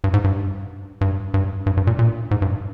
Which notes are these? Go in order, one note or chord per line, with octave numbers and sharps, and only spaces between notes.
G2
G#2
G2
G2
G2
G2
G2
A#2
A#2
G#2
G2